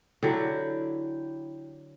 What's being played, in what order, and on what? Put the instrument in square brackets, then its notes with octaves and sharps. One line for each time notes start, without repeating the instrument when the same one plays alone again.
[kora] D3 F#3 [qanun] E4 G4